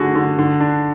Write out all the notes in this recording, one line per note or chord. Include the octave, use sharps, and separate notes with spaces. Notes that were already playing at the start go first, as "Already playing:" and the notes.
Already playing: D3 A3 F#4 G#4
D3
D3
D4